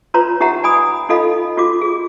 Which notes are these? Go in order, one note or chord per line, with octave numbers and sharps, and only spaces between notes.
F4 B4 C#5 A#5 C6
D#4 G4 E5 F#5 A#5
D5 G#5 B5 D#6
D#4 F4 A4 D#5 F5 B5
F4 F#4 D6
G#4